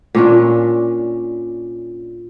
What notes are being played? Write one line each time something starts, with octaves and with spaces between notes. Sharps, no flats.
A#2 C#4 D4